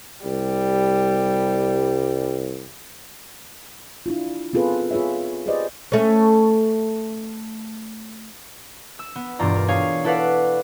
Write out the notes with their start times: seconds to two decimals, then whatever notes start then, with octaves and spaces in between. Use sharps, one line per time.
0.25 C2 G3
4.06 D4 E4 F4
4.53 B3 C4 F4 G#4 A4 B4
4.91 F4 G#4 B4 C#5 E5
5.46 G4 G#4 B4 C5 D5 D#5
5.92 A3 C#4
8.99 E6
9.15 B3
9.39 E1 G2 F4 D5 A#5
9.56 A#4
9.68 G#4 C#5 F5
10.04 E4 A4 B4 D5 F5 F#5